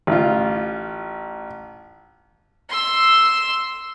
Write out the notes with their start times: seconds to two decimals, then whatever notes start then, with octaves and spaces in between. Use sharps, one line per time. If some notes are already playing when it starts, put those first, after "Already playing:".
0.07 A1 F4
2.70 C6 E6